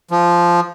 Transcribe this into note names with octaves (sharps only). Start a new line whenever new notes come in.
F3